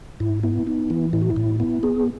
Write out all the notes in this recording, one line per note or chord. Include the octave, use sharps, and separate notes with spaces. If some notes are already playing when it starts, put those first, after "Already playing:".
G#2 E4
B3 E4
B3 D#4
E3 E4
A2 E4
F#4
E4
A2
B3 E4
B3 G#4